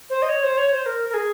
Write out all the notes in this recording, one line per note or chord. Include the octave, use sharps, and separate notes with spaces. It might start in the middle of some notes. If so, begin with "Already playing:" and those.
C5
D#5
C#5
C5
C#5
C5
A#4
A#4
G#4